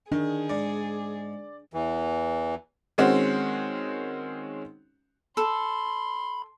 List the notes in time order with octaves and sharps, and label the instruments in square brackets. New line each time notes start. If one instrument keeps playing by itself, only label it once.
[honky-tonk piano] D#3 [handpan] D4 [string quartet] G#4
[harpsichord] G#2 [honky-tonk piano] D5
[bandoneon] E2 E3
[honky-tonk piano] D#3 G#3 C4 C#4 F#4
[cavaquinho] A4 [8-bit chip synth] B5 [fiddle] C6